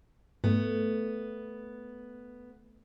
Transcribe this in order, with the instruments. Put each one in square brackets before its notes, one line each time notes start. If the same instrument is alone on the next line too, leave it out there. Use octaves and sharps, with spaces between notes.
[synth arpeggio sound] G#2 [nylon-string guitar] A3 [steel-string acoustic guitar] B3